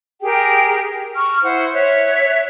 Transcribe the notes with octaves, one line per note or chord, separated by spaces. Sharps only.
G4 G#4 A#4 G5
C#6 F6
E4 C5 F#5
C#5 E5 F#6